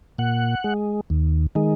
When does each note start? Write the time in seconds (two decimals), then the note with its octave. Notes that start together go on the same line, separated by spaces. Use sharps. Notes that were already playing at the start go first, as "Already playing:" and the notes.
0.18 A#2 F#5
0.64 G#3
1.10 D#2
1.55 D#3 G#3